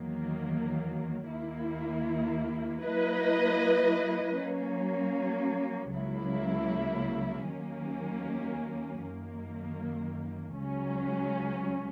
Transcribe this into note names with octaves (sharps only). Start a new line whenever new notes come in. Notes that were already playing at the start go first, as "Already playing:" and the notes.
Already playing: E2 D#3 F#3 A#3
D#2 D#3 A#3 E4
F#3 A#3 E4 B4 D#5
F#3 A#3 C#4
C#2 C#3 F#3 A#3 E4
D#2 D#3 F#3 A#3 C#4
F#2 D#3 A#3
C#2 C#3 F#3 C#4